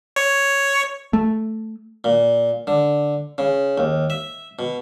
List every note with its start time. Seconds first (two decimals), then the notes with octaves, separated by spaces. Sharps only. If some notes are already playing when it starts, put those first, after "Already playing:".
0.16 C#5
1.13 A3
2.04 A#2
2.67 D3
3.38 C#3
3.78 D#2
4.10 E5
4.59 B2